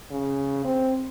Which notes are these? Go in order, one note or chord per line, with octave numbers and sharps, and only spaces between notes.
C#3
C4